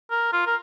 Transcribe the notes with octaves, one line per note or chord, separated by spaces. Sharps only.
A#4
F4
A#4